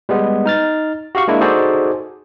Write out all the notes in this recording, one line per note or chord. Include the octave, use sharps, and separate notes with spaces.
G3 G#3 B3
D#4 F6 A6
F#4 G4 F5 C#6
G#3 A#3 D4 E4
D#4 F#4 G#4 A4 C5 D5